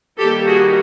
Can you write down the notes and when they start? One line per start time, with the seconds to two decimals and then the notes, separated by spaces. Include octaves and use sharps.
0.18 D#3 G3 A#3 G4 A4
0.47 F#4 G#4